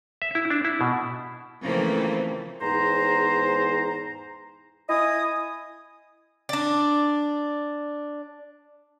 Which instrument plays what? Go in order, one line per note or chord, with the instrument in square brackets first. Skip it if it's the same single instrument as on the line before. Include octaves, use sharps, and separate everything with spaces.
[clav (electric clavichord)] E5
E4
D4
E4
B2
[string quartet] C#3 E3 F3 A3 A#3 C4
[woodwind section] E2 G#2 C5 A#5
E4 D#5 G#5 D#6
[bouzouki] D4 D5